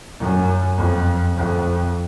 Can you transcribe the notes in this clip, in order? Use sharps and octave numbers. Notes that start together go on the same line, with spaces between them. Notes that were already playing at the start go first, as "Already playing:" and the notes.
F#2
F2
F2